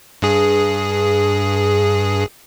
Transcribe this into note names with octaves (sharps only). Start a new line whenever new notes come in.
G2 G#4